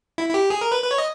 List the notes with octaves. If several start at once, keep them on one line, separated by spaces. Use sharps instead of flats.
E4
E4
G4
G#4
A#4
B4
B4
C#5
D#5